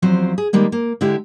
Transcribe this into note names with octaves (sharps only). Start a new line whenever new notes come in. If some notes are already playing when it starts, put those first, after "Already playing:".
E2 F3 F#3 C4 C5
G#4
D#3 G3 G#3 A#3
A#3
D3 G#3 E4 G4